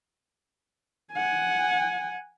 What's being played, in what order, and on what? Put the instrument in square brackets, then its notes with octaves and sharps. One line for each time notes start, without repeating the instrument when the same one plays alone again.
[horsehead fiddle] F#5 G#5